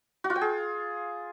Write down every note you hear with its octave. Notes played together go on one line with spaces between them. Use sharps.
F#4
F4
G5
G#4